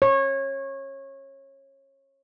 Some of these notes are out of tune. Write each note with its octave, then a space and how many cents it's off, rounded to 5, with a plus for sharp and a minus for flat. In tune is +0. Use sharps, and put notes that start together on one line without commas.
C#5 -25